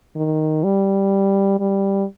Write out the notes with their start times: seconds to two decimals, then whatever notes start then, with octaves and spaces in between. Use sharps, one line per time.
0.16 D#3
0.64 G3
1.60 G3